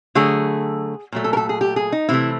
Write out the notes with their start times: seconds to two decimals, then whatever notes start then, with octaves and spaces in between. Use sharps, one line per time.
0.15 D3 F#3 A3 G#4
1.12 A#2 F#3 A3
1.24 A4
1.33 A#4
1.37 A4
1.49 G#4
1.61 G4
1.76 G#4
1.92 D#4
2.09 C3 E3 A3 E4